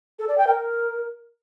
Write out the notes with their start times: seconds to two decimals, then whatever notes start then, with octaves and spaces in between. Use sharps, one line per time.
0.19 A4
0.28 D5
0.37 G5
0.47 A#4